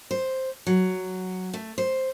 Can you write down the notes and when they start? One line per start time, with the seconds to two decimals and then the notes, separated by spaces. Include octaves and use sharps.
0.11 C5
0.67 F#3
1.54 A3
1.78 C5